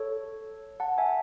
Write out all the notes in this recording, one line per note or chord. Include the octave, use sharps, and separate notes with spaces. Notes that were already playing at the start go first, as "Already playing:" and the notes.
Already playing: A4 C#5
F#5 A5
E5 G#5